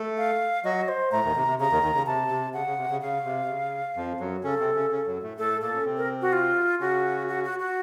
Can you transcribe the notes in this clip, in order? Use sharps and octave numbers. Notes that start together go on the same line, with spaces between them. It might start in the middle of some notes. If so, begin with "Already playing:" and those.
Already playing: A3 A4
F5
F#3 F#4 D#5
C5
A2 A3 A#5
D#2 D#3
C3
C3
C#3 A#5
D#2 D#3
D#2 D#3
C#3
C3 A5
C3
C#3 F#5
C#3
C3
C#3
C#3 F5
C3
C#3
F2 F3
F#2 F#3
C#3 C#4 A4
C3 C4
C#3 C#4
C#3 C#4
F#2 F#3
A2 A3
A2 A3 A4
A#2 A#3 A4
C#4
C3 C4
A#4
F#4
F4
C#3 C#4 F#4
F#4
F#4
F#4